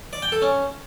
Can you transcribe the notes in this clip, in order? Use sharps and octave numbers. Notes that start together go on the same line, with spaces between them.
D5
G5
A4
C#4